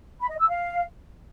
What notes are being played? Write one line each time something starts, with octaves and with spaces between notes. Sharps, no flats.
B5
D#5
E6
F5